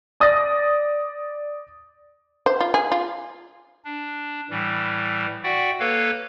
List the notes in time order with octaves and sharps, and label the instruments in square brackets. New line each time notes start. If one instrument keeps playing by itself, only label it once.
[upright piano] D5 D#6 A6 A#6
[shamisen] C5
F4
G#4
F4
[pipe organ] D4
A2 E3 G3
F#4 D5 E5 F#5 G5
A#3 A4 B4 C#5 F5